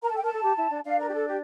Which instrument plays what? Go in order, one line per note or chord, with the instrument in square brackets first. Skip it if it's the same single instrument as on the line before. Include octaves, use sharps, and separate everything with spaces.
[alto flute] A#4 [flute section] A#5
[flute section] A5
[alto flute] A4
[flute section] G5
[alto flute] A#4 [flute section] A5
[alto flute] A4
G4
E4
D4
[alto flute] D4 [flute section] F5
[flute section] A#4
G4
A4
G4